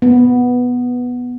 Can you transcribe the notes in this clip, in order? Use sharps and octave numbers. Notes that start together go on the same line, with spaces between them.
B3